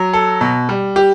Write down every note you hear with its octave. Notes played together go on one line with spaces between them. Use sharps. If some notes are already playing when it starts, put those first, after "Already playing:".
Already playing: F#3
A4
B2
G3
G4